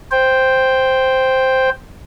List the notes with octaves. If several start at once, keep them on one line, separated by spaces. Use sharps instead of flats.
C5 G5